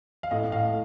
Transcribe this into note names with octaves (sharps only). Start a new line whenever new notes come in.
F5
A2 D#5
A2 F5